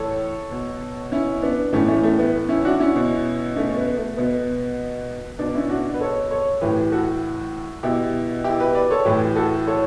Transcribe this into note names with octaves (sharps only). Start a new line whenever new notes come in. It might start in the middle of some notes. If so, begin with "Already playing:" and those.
Already playing: A2 E3 A4 C#5
B2
C#4 E4
B3 D4
A2 E3 A3 C#4
A3 C#4
A3
B3
C#4 E4
D4 F#4
C#4 E4
B2
A3 C#4
B3
A3
B2 B3
B2 B3 D4
C#4 E4
D4 F#4
B4
A4 C#5
A4 C#5
A2 E3 G4 B4
F#4 A4
B2 E4 G4
E4 G4
G4 B4
B4 D5
A4 C#5
A2 E3 G4 B4
F#4 A4
A4 C#5